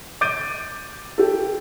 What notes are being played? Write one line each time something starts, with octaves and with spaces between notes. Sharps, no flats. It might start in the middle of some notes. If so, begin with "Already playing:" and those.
D6 G6 A6 D7 D#7
G4 A4